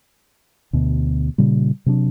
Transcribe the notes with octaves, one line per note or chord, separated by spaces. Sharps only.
D2 B2
A#2 C#3 G3
C3 F#3 C4 D4